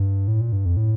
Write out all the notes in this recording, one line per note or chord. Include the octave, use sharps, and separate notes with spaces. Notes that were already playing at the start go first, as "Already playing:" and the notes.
Already playing: G2
A2
A#2
G2
F2
A2